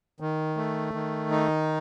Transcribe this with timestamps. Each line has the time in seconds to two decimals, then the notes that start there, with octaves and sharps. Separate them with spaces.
0.20 D#3
0.57 A3
0.94 D#3
1.31 D#4